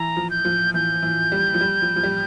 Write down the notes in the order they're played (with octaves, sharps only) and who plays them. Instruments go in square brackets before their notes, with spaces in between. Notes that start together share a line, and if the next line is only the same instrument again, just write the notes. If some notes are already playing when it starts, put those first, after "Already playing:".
Already playing: [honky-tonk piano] E3 [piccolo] A#5
[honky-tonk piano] F3
[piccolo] G6
[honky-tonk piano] F3
[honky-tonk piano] E3 [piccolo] G6
[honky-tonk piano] E3
G3
F3
G3
F3
F3
G3